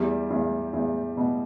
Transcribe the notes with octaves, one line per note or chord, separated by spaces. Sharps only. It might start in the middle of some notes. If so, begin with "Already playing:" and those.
Already playing: E2 G3 G4
E2
E2
B2